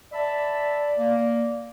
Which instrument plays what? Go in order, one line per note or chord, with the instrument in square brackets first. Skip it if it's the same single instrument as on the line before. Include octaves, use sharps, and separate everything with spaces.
[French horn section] D5 [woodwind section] E5 A5 B5
[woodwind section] A#3